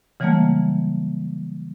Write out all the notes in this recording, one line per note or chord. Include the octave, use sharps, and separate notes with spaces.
C#3 E3 F#3 G3 A3 A#3